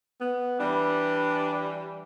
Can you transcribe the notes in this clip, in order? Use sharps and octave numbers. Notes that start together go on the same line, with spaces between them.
B3
E3 G3 D4